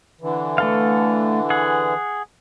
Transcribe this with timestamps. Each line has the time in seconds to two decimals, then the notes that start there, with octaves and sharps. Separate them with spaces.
0.21 D3 E3
0.58 A3 A4 F5
1.50 G#4 F#5